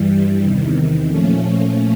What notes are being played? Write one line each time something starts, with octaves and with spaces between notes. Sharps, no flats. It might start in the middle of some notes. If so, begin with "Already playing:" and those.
Already playing: G2 E3 G3
E2 C3 D#3
A#2 F3 A3 C#4